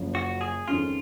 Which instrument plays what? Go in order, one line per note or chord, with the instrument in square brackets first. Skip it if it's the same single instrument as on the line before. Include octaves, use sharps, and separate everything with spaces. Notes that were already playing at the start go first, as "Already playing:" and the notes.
Already playing: [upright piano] F#1 F#2 F3
[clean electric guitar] F#4
G#4
[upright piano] F2 D#3 G#3 C#4 [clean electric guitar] F4